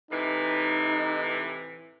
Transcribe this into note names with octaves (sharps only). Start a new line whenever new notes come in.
A2 C3 E3 D#4